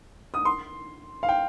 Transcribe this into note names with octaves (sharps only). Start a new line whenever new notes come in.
D#6
C6
F5
G5